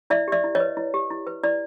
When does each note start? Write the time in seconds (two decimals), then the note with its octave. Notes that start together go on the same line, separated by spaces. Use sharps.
0.10 E4 D5 E5
0.28 G4 D5 E5
0.44 E4
0.55 C#5 D#5
0.60 B4
0.77 E4
0.94 G4
1.10 E4
1.27 B4
1.43 E4 D5